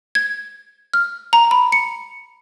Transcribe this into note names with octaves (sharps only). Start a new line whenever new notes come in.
G#6
F6
A#5
B5
C#7